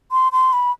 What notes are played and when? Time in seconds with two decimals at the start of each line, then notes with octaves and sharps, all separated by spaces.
0.12 C6
0.32 C6
0.53 B5